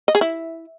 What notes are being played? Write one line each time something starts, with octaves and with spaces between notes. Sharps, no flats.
D#5
G#4
E4